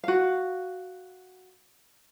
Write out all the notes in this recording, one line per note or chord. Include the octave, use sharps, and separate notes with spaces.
F#4 F5